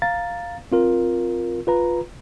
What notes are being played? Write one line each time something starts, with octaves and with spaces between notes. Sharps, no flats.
F5 A#5 A6
C4 F4 A#4
F4 B4 A#5